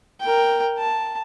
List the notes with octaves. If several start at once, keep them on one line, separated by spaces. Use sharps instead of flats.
A#4 G5
A5